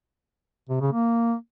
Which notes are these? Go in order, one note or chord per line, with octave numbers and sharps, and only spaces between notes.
C3
C#3
A#3